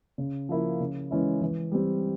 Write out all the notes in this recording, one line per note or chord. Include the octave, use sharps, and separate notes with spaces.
C#3
F3 A#3 E4
C#3
E3 G#3 C#4 E4
E3
G3 C4